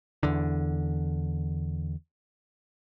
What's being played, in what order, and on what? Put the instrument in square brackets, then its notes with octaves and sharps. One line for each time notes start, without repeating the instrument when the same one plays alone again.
[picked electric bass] E2 D3